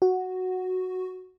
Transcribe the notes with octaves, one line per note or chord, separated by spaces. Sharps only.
F#4